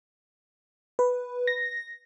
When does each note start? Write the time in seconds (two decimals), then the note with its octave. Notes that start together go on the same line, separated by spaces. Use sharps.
0.99 B4
1.47 A#6